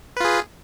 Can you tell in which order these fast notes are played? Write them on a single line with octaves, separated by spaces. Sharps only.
B4 F4 G#4